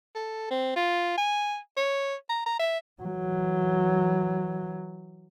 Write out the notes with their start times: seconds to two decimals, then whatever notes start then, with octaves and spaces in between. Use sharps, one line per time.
0.15 A4
0.51 C4
0.76 F4
1.17 G#5
1.77 C#5
2.29 A#5
2.46 A#5
2.59 E5
3.02 E3 F#3